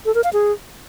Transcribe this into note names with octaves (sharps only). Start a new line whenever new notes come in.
A4
A#4
F5
G#4